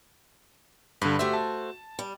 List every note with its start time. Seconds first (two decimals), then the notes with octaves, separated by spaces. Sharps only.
1.02 G2 D3 B4
1.19 A3 F#4 G4 C5 E5
1.33 A5
1.99 G3